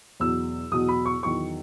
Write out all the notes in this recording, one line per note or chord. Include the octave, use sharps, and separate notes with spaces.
E2 B2 F#3 E6
E2 B2 F#3 D#6
B5
C#6
E2 D#3 F#3 C#6